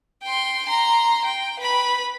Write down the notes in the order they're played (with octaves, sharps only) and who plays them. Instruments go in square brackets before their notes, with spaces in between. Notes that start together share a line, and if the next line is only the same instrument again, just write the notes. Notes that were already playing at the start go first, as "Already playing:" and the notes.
[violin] G5 C6
A#5 C6
G5
B4 B5